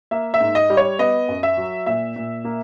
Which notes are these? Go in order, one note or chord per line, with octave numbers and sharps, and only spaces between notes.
A#3 E5
E5
G#2
D#5
G3
C#5
B3 D#5
F#2
E5
F#3
A#2 E5
A#2
A#3